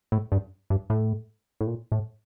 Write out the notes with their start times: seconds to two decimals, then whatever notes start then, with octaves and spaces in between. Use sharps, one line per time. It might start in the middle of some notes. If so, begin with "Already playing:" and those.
0.12 A2
0.32 G2
0.70 G2
0.90 A2
1.61 A2
1.67 A#2
1.92 A2